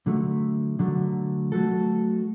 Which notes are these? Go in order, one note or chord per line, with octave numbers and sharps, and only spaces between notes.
D3 F#3 A3
D3 F#3 A3
F#3 A3 F#4 A4